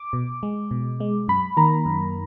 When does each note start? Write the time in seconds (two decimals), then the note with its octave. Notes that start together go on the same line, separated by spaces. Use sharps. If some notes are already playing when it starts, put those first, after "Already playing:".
Already playing: D6
0.13 B2
0.43 G#3
0.71 B2
1.00 G#3
1.28 F#2 B5
1.57 D#3 A#3 A#5
1.86 F#2